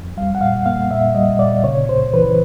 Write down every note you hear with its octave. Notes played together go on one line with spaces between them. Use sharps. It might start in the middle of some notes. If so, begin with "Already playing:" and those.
Already playing: F2
G3 F5
F#5
A#2 F5
A#3 F5
A#2 E5
G3 D#5
A#2 D5
C#3 C#5
C#2 C5
E3 B4